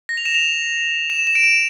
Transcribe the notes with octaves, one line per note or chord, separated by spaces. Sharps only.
A#6
F7
E7
F7
E7
E7
D7
E7